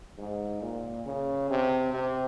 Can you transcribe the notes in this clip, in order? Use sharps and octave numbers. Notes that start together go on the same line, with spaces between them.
G#2
A#2
C#3
C3
C3